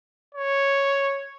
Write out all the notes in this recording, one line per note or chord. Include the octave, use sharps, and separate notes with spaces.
C#5